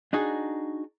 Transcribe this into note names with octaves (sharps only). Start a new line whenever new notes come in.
D4 D#4 F#4 G#4